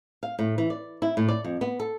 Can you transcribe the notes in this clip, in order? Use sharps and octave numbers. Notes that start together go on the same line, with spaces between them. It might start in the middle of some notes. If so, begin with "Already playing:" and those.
F5
A2
E3
D5
E4
A2
D5
F2
B3
A4